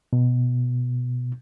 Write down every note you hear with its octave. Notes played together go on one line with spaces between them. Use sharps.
B2